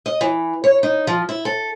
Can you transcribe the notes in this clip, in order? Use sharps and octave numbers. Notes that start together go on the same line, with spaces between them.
D#5
E3
C#5
D#4
F3
E4
A4